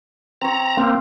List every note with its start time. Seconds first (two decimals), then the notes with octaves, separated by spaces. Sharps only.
0.41 C4 C#5 A#5
0.77 A#3 C4 C5